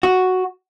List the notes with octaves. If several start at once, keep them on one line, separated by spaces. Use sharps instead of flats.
F#4